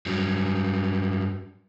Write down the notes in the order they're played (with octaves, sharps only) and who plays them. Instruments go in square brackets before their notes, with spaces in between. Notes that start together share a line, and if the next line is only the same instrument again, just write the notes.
[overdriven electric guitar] G2 F#3